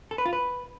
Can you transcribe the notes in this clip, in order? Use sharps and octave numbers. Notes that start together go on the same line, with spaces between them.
A4
B4
F4
B4